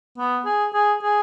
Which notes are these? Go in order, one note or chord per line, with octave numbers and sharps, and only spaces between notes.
B3
G#4
G#4
G#4